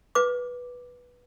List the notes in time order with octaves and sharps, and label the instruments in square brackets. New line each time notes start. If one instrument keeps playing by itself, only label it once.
[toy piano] B4 D6